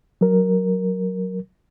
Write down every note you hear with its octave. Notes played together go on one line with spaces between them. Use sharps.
F#3 A#4